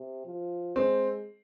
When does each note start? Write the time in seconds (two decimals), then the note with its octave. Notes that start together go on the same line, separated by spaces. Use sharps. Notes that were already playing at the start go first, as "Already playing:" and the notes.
Already playing: C3
0.25 F3
0.76 G#3 C4